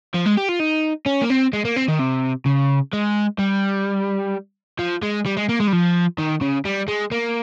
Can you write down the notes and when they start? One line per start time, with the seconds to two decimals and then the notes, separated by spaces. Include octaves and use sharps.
0.14 F3
0.26 G#3
0.37 G4
0.49 F4
0.59 D#4
1.06 C#4
1.22 A#3
1.30 C4
1.53 G#3
1.65 A#3
1.76 C4
1.89 D#3
2.00 C3
2.46 C#3
2.93 G#3
3.39 G3
4.79 F3
5.03 G#3
5.26 G3
5.37 G#3
5.49 A#3
5.60 G#3
5.68 G3
5.73 F3
6.19 D#3
6.41 C#3
6.65 G3
6.88 G#3
7.12 A#3